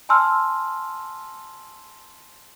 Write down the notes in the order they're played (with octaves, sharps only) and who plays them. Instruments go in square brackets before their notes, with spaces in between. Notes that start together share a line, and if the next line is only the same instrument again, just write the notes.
[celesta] G#5 A5 C6 E6 F6